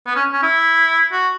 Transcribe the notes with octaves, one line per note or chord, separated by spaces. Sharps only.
B3
C#4
C#4
E4
F#4